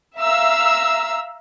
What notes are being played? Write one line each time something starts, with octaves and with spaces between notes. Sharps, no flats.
E5 F5 A#5 E6